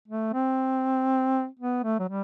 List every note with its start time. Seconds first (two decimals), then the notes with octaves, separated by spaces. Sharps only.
0.08 A3
0.33 C4
1.59 B3
1.83 A3
1.99 F#3
2.09 G3